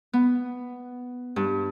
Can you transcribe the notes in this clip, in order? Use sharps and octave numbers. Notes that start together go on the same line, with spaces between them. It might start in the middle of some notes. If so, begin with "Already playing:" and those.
B3
G2